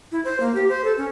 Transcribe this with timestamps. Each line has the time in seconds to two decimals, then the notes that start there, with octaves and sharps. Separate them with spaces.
0.12 E4
0.25 C5
0.40 A#3
0.55 G4
0.69 C5
0.84 A4
0.97 C#4